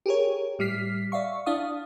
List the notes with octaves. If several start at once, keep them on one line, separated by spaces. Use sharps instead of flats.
G4 G#4 A#4 C#5
A2 G3 F6 B6 C7
D5 E5 F5 C#6
D4 E4 F5 D#6